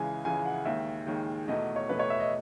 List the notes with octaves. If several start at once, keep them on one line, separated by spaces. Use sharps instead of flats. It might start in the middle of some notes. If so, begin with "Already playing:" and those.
Already playing: C#2 C#3 E3 G#3 G#5
C#2 C#3 E3 G#3 G#5
F#5
D#2 D#3 G#3 E5
D#2 D#3 G#3
E2 B2 A3 D#5
C#5
E2 B2 A3 B4
C#5
E5
D#5